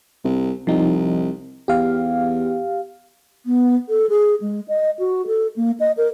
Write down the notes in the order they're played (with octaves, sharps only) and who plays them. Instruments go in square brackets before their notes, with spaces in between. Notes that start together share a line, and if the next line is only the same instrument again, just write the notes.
[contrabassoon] C2
[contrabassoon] C2 [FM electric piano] F3 D#4
[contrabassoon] E2 [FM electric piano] G4 F5
[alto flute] B3
A4
G#4
G#3
D#5
F#4
A4
A#3
D#5
A#4